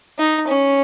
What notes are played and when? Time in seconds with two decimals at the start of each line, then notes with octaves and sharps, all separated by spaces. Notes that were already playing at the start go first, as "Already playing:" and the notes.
0.18 D#4
0.48 C#4